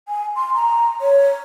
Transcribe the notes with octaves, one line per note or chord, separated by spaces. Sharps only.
G#5
C6
A#5
C#5